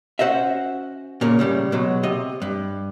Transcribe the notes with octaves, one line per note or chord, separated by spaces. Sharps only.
C#4 F#4 C5 D#5 E5
A#2 C#3 A#3
A2 C#3 G3
B2 F#3 G#3
C3 D#5
G2